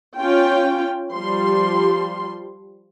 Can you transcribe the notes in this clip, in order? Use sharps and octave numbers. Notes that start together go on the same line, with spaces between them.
C#4 F4 G5
F3 G3 C6